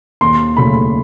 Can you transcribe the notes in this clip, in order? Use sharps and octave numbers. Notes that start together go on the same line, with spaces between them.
D#2 C6
C#3 F#3 A3 B5